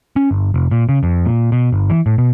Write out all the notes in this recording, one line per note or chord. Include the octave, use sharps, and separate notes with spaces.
C#4
G1
F1
A#2
C#3
F2
A#2
B2
G1
E3
A2
B2